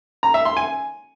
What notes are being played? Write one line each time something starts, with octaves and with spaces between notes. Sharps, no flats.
A#5
E5
C6
G#5